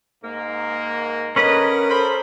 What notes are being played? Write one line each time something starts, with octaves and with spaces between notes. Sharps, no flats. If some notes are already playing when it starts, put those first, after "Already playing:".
G#2 A#3
D3 C#4 A#4 B4 D#5
A4 C5 B5